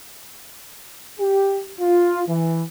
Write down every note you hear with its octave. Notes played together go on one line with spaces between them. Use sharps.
G4
F4
E3